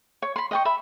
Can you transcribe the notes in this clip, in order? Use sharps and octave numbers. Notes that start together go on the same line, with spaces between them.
C#5
B5 C6
D#5 G5 C#6
E5 B5